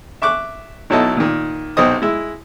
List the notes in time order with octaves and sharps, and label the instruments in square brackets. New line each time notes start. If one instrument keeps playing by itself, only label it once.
[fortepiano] E5 C#6 D6 F#6
B1 F#3 E4 A4 D#5
A#2 D#3
B1 C3 C4 D#5 D#6
G#3 E4